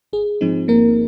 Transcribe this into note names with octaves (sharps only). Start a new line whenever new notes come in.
G#1 G#4
G#2 F3 C4 D#4
G#1 A#3 A#4